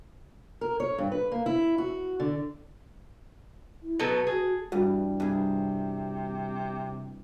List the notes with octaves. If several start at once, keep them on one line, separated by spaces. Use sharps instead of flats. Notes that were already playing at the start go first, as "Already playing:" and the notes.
A#4
C#5
G2
B4
A#3
E4
F#4
D3
E4
B2 F#3 A4 B4
F#4 G#4
G2 E3 G3 F#4
G2 C3 G#4